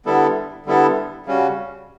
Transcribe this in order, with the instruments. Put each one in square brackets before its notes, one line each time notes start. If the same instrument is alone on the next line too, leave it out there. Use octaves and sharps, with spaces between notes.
[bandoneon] D3 G3 B3 E4 A4
D3 G3 B3 E4 A4
C#3 G3 C#4 F#4